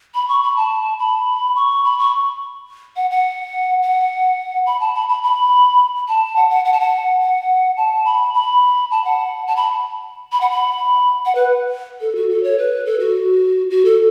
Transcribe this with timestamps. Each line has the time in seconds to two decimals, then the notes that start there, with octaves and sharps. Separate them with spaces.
0.15 B5
0.28 C#6
0.43 B5
0.56 A5
0.99 B5
1.56 C#6
1.84 B5
1.98 C#6
2.96 F#5
3.11 F#5
3.82 F#5
4.66 B5
4.80 A5
4.95 B5
5.09 B5
5.23 B5
6.08 A5
6.36 F#5
6.50 F#5
6.65 F#5
6.72 A5
6.80 F#5
7.20 F#5
7.77 A5
8.05 B5
8.34 B5
8.91 A5
9.04 F#5
9.47 A5
9.56 B5
10.32 B5
10.41 F#5
10.51 B5
11.26 F#5
11.35 B4
12.01 A4
12.16 F#4
12.30 A4
12.43 C#5
12.58 B4
12.86 A4
13.00 F#4
13.70 F#4
13.85 A4